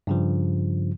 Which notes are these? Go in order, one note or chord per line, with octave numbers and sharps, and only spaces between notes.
G2 C#3 F3